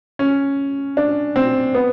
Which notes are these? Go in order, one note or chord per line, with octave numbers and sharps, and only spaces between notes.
C#4
D4
C4
B3